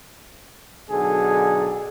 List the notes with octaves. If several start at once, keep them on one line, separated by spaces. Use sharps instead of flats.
B1 D3 G#4 A4